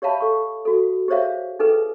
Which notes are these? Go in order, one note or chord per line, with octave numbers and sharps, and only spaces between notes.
G4 C#5 E5 F5 A5 B5
A4 C#6
F#4 A4
G4 G#4 C5 C#5 E5 F5
D#4 G#4 A4 B4 G5